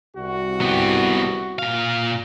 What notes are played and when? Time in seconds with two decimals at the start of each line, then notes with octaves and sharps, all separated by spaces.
0.15 C2 F#4
0.61 B3 G4
1.59 A#2 F5